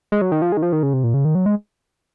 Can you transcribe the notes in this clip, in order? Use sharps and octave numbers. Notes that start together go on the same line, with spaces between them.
G#3
F#3
D#3
F3
G#3
D#3
F3
D#3
C#3
C3
A#2
C#3
D#3
F#3
G#3